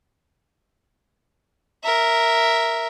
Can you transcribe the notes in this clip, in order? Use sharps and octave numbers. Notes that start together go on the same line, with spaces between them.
A#4 E5